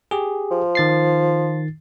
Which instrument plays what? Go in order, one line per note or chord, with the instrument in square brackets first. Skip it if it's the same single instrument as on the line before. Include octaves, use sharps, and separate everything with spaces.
[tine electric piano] G4 G#4
[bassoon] F3
[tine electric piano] D#3 A6 C7